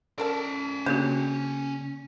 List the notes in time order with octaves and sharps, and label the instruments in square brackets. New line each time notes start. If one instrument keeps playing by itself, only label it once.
[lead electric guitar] C#4 D5 [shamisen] A4 A#4 A5
[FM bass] C#3 [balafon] A#3 B3 F#4 [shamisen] D4 G4 A4